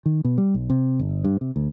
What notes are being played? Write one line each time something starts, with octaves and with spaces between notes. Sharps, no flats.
D#3
B2
G3
B1
C3
G1
G2
C3
D2